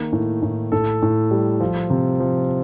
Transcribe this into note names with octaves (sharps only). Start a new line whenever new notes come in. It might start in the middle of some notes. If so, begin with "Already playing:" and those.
Already playing: D#3 A#3
A2
A2
A2 A4
A2
G3
F3
C3
F3